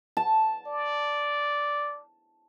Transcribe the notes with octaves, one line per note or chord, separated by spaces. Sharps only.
A5
D5